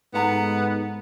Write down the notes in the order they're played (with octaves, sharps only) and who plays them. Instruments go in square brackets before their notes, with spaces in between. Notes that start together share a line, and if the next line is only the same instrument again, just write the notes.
[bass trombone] G#2 [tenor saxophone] B3 [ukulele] A4 F#5 A#5